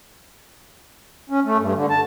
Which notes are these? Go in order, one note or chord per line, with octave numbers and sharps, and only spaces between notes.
C#4
A3
G2
D3
A5